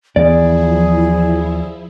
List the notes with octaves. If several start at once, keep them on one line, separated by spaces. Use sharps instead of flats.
D#2 E3 F3 B3 E4 G#4 D5